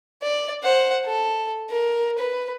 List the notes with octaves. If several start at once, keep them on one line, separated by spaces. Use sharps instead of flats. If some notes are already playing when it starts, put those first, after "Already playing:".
D5
C5 F#5
A4
A#4
B4